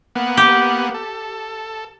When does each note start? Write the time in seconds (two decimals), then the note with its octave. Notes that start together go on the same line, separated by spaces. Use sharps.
0.16 A#3 B3 F#5
0.37 G4
0.94 A4